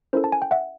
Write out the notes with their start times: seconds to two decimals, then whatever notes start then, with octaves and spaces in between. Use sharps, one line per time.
0.13 C#4 E4 A4 A#4 C5
0.24 A5
0.32 G#5
0.42 G5
0.51 E5 F#5